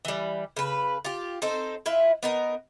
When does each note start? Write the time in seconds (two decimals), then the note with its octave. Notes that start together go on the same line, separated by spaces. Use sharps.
0.05 E3 G3
0.57 C#3 B4
1.05 F4 G4
1.42 C4 D#4 A4 C5
1.86 E4 F4 B4 E5
2.23 B3 D#4 A#4